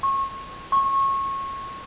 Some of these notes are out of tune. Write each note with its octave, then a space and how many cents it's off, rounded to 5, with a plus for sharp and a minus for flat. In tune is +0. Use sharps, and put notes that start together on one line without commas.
C#6 -30
C#6 -25